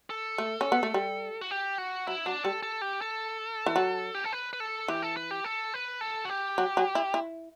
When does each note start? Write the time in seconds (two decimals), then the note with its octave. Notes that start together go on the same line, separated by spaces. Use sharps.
0.10 A4
0.38 A3
0.61 C#4
0.72 B3
0.83 A3
0.94 G3
1.41 F#4
1.51 G4
1.78 F#4
2.07 F#3 E4
2.26 F#3 D4
2.44 G3 A4
2.63 A4
2.81 G4
3.01 A4
3.66 E3
3.76 F#3
4.14 G4
4.24 A4
4.33 B4
4.53 B4
4.60 A4
4.88 E3 G4
5.02 A4
5.17 B4
5.31 G4
5.44 A4
5.74 B4
6.01 A4
6.25 F#4
6.29 G4
6.58 F#3
6.77 F#3
6.95 E4
7.14 E4